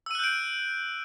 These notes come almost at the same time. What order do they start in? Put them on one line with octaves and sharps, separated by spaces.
E6 D#7 F#6 G6 D7